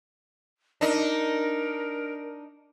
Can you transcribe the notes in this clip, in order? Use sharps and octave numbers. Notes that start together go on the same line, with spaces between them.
D4 D#4 A#4